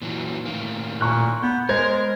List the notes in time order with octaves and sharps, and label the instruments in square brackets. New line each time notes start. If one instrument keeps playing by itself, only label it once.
[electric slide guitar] A#2 E3 F#3
A2 D#3 A#3
[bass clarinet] A#2 [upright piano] A#5 C#6 F#6
[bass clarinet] B3 [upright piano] G6
[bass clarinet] G#3 [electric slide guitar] A#4 [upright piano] C5 G#6